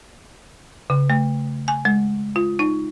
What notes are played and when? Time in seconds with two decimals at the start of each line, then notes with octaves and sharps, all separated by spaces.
0.90 C#3
1.10 A3
1.68 G#5
1.85 G#3
2.36 F4
2.59 D#4